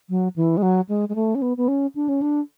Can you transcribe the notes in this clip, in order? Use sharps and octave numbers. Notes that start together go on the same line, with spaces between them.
F#3
E3
G#3
F#3
G#3
G#3
A3
C#4
B3
B3
C#4
D4
C#4
D4